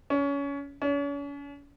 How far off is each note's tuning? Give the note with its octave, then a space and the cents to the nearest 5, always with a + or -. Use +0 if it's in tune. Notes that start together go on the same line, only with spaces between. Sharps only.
C#4 +25
C#4 +40